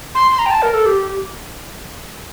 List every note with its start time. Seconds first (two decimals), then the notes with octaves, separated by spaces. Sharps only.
0.15 C6
0.31 C6
0.39 A#5
0.46 G5
0.51 A5
0.62 A#4
0.74 A4
0.86 G4